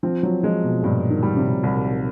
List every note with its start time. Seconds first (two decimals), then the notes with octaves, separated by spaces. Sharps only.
0.03 F3 C4
0.23 F#3
0.43 F3 G#3
0.64 B2
0.83 G2 A#2
1.10 D#3
1.23 G3
1.37 C3
1.63 C2